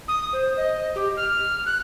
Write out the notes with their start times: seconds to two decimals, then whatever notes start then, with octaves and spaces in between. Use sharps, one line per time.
0.08 D#6
0.33 C5
0.57 D#5
0.95 G4
1.17 F6
1.66 F#6